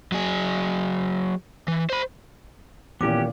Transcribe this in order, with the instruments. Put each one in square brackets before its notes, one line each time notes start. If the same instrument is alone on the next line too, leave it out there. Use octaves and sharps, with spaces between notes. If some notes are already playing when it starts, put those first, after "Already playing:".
[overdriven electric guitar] F#3 G#4
E3
C5 B5
[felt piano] D#1 A1 A#2 [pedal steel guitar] B3 C#4 G4 [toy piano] E4 D6